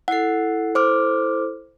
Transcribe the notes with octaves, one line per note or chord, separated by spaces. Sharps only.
E4 A4 F#5 C7
C5 D6 F6